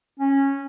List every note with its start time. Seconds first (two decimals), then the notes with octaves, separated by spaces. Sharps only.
0.20 C#4